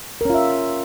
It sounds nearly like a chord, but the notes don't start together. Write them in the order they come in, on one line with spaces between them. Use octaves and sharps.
A#4 C#4 F4 E5